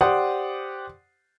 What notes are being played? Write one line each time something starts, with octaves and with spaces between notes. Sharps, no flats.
G4 C5 D5 F#5 C6 D#6